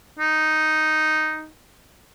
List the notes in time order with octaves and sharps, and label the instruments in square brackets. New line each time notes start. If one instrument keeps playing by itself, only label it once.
[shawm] D#4